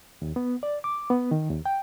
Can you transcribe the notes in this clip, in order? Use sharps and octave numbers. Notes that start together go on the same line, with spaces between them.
D#2
B3
D5
D6
B3
D#3
D#2
G5